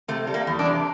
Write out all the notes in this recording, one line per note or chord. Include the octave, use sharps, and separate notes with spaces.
C3 A3
G3
A#3
E2
D4
C3